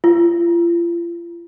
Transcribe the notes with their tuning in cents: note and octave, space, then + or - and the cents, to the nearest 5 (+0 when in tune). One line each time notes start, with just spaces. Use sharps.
F4 -35